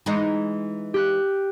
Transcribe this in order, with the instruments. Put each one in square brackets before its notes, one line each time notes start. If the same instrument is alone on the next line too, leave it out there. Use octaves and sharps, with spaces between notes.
[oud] E3 G#3 D#4
[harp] G4 F#6